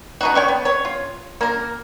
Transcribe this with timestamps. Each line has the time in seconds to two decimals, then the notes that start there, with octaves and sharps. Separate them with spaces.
0.21 B2 D#4 F#4
0.35 C#5 G5 C#6
0.48 B3
0.65 C#5
0.85 F4
1.41 A#3 A#4